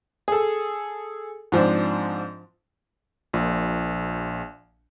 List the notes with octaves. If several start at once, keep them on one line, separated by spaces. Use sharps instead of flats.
G#4 A4
G#2 F3 C4 D4
A#1 A#2